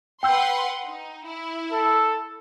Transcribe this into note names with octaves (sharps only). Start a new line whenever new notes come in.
B4 F#5 G5 C6 E6 G6
D#4
E4
A4